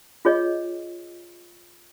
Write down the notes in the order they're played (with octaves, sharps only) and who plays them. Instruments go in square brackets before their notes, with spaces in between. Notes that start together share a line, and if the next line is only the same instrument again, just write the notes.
[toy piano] F4 G#4 C#5 D#5